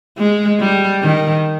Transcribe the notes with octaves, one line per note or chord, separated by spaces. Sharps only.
G#3
G3
D#3